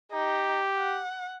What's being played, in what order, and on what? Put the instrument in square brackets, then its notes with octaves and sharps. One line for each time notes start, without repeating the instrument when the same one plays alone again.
[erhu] D#4 [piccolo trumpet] G4
[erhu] F#5